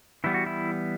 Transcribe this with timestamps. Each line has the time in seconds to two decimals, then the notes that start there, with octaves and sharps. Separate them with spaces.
0.24 E3 G3 B3 E4
0.34 F#4
0.46 E4